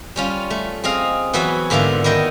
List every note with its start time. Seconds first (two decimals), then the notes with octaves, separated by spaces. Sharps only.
0.16 G3 C#4 F4
0.50 A3
0.84 C4 G#4 D#5 F5
1.33 E3 F#3 B3 F#4 G#5 B5
1.70 G#2 D3 A#3 B3 E4 F4
2.04 D#3 B3 E4 D#5 G5